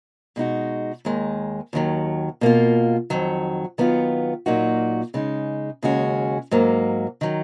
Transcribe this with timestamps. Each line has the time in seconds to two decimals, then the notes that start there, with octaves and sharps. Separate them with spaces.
0.36 B2 G#3 D#4 F#4
1.05 D#2 D#3 G#3
1.73 D#2 D#3 F#3
2.41 B2 A#3 F4
3.10 F2 D#3 F#3
3.78 D#3 F#3 B3 F4
4.46 A#2 F#3 A#3 D#4 F#4
5.14 C#3 G#3 D#4
5.83 D#2 C#3 G#3 C#4 F#4
6.51 G#2 F#3 A#3
7.21 D#3 F#3